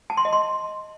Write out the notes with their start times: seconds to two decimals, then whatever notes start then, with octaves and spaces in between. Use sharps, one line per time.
0.10 A5
0.17 C6
0.25 D#5
0.33 C6